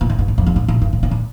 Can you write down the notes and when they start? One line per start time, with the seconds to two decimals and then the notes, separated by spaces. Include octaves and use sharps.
0.01 A#2
0.10 A2
0.19 G2
0.28 A2
0.38 F2
0.46 G2
0.56 A2
0.68 A#2
0.82 G2
0.93 A2
1.03 A#2
1.11 A2